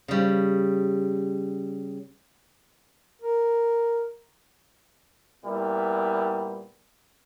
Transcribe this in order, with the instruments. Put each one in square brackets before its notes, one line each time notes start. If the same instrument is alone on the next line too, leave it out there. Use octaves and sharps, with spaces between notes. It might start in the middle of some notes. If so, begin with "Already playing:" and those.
[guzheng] C#3 G3
[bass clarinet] A#4
[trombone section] A#2 G3 B3 E4